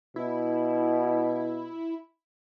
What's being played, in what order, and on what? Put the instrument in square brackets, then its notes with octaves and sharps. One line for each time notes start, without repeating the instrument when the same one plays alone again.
[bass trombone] B2 [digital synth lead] E4